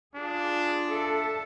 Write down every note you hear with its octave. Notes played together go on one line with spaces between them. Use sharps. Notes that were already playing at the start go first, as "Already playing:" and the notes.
D4 F4 G#4
A4 E5